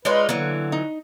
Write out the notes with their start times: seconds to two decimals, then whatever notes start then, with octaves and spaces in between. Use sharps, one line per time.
0.05 G#3 D#4 F4 B4 C#5 D5
0.29 D3 E3 F#3 A#3
0.72 D#4